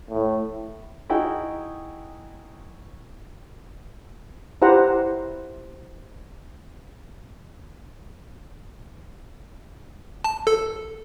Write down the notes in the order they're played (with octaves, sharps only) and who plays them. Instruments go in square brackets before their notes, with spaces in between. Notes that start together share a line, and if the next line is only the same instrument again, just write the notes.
[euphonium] A2
[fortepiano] D#4 E4 F#4 G#4 G5
[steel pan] E4 G4 C5 F#5 A#5
[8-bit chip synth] A5
A4